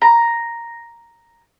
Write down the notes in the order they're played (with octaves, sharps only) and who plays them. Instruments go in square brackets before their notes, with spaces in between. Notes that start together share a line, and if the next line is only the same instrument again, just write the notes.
[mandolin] A#5